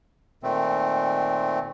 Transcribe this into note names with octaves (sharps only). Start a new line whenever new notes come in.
A#2 D#3 A3 C4